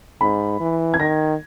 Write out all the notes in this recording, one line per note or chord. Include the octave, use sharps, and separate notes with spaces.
G#2 B5
E3
G#6
D#3 A#6